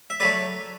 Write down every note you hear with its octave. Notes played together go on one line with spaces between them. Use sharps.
E5
F#3 A3 B4 D5